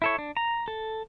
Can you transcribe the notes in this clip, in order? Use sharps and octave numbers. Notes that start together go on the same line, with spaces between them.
E4 A4 C#5
D4
A#5
A4